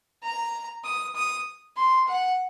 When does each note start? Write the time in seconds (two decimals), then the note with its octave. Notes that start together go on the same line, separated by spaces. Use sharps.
0.23 A#5
0.85 D#6
1.15 D#6
1.77 C6
2.08 F#5